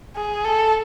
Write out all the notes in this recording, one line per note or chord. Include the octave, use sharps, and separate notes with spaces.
G#4
A4